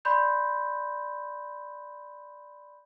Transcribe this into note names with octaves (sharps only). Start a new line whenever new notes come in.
D5 B5 C6 G6